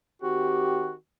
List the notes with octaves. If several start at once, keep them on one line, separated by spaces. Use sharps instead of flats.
D#3 C4 F#4 G4